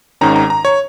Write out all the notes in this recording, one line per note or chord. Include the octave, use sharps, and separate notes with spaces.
G#1 G#2 D#3 C#4 A#5
A#5
A#5
C#5